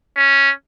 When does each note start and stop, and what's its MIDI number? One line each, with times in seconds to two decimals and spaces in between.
0.17 0.51 61